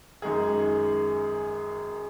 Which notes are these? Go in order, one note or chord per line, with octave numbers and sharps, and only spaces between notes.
F#2 D#3 G#3 D#4 G#4